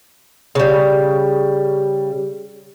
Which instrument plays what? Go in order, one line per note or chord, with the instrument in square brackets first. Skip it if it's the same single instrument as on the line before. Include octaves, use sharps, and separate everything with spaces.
[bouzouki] C#3 G3